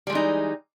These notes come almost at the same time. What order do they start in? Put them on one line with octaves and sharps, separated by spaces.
G3 G#3 E3 D#4